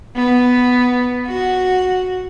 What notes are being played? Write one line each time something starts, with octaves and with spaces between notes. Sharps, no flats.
B3
F#4